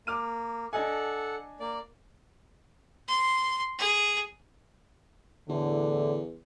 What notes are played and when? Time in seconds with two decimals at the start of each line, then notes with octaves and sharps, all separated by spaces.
0.07 A#3 D6 F6 D#7
0.73 D4 A4 D#5 F#5 G#5
1.60 A#3 D5
3.08 C6
3.79 G#4
5.49 E2 A2 D3